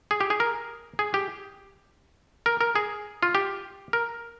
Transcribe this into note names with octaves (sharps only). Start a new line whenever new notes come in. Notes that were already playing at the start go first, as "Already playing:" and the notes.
G#4
G4
G#4
A#4
G#4
G4
A#4
A#4
G#4
F4
G4
A#4